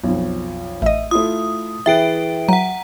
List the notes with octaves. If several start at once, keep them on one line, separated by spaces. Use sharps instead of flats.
B1 F2
A1 D#5 E5
A3 E4 F4 D#6
E3 G#4 B4 E5 G5 D7
F#3 F#5 A#5